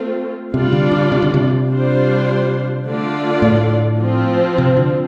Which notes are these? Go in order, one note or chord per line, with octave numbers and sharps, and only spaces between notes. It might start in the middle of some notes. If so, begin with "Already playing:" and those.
Already playing: A3 C4 F4
C3 G3 D4 F4 D5
D3
D3
C3
D3
C3
G3 D4 F4 C5
D3 A3 F4 D5
A2
F3 C4 F4
C3
D3